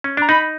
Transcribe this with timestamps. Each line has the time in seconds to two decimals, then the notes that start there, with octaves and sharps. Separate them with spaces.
0.04 C#4
0.17 D4 A#5
0.29 D#4 B5